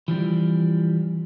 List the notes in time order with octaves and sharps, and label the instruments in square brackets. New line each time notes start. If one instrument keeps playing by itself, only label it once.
[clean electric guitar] E3 F3 G3 C4